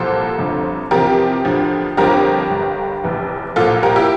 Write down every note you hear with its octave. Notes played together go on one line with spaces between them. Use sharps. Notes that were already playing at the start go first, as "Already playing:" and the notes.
Already playing: C2 A#2 F3 A4 C5
G1 F2 D3 F3
E2 C3 F3 G4 A#4
D2 D3 F3
G1 F2 D3 F3 G4 A#4
G1 G2 D3
F1 E2 E3
C2 A#2 F3 F4 A4
G4 A#4
E4 G4